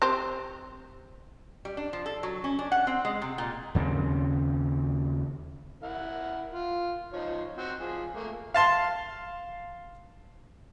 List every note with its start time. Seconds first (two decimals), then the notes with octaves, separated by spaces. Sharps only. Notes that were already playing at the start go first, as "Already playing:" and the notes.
0.02 C4 G4 C5
1.65 G3
1.77 D4
1.93 F3
2.06 A4
2.23 F#3
2.44 C#4
2.59 D4
2.72 F#5
2.87 C4
3.05 G#3
3.22 C3
3.38 A#2
3.75 D#2 C#3 C4
5.83 E4 A#4 F#5
6.54 F4
7.13 F3 D#4 C#5
7.57 C4 F#4
7.80 F3 G#4
8.16 A3 A#3
8.54 F5 A5 C6